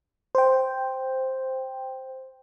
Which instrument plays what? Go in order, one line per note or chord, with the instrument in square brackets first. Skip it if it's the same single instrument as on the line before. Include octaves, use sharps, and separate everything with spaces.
[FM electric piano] C5 G5